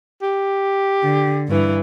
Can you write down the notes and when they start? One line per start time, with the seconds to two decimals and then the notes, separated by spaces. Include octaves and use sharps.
0.22 G4
1.03 D3
1.47 G2 E3